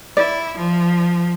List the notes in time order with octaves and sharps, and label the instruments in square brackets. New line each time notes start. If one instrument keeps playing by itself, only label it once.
[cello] E4 [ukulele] D5
[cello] F3